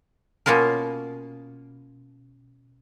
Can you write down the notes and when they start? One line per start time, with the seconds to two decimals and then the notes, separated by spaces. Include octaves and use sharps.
0.46 B2 A#3 C#4 F4 A#4